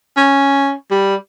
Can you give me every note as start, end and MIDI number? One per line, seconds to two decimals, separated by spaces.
0.17 0.73 61
0.92 1.16 55